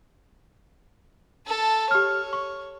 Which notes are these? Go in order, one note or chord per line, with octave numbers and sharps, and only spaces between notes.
A4 A5
G4 C#5 F6
C#6